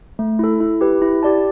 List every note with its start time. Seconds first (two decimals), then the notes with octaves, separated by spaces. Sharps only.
0.19 A3
0.39 E4 A4
0.60 E4
0.81 G4 B4
1.02 E4
1.23 G4 D5 A5